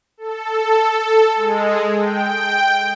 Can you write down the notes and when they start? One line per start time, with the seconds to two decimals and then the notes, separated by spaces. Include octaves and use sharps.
0.17 A4
1.36 G#3
1.97 G5